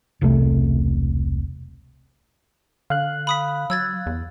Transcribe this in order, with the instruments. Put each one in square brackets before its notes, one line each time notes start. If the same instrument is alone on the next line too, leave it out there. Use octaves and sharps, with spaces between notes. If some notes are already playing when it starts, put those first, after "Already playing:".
[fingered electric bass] E1 C2 C3 A3
[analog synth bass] D3 [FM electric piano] F5 F#6
[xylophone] B5 D#6 B6
[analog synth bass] F#3 [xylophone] E6 G#6 A6
[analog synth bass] E2